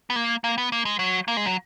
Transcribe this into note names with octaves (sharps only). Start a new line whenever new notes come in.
B3
A#3
A#3
B3
A#3
G#3
F#3
A#3
G#3
F#3